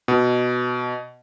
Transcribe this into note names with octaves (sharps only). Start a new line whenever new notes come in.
B2